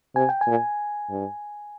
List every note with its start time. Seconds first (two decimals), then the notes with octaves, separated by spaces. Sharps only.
0.15 C3 G#5
0.29 G5
0.41 G#5
0.47 A#2
1.10 G2